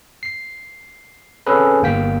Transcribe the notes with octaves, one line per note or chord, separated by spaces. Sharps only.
C7
C4 C#4 G#4 A4 B4
G1 A#3 G5 B6